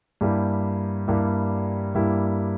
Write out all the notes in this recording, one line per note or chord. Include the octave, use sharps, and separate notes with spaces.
G2 G3 A#3 E4 G4
G2 G3 A#3 E4 G4
G2 G3 A#3 E4 G4